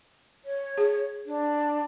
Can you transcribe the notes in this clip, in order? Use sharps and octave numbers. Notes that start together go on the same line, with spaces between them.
C#5
G#4
D4